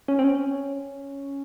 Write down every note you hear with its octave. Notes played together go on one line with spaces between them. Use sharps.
C#4
C4
C#4